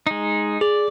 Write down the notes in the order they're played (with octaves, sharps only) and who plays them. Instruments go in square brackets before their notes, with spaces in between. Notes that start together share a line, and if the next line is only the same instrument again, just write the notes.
[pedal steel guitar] G#3 D#4
[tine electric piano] G#4 [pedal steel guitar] D5